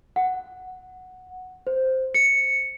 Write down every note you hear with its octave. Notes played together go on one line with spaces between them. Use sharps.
F#5
C5
C#7